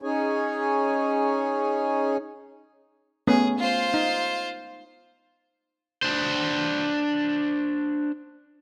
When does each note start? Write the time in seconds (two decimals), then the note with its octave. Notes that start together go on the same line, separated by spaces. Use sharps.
0.02 C#4 D#4 G#4 C#5 G#5
3.27 A3 B3 C#4 G#4
3.58 F4 C5
3.94 D#4
6.03 D4 C5